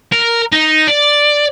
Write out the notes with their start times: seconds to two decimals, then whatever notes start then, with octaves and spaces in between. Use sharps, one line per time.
0.12 A#4
0.52 D#4
0.87 D5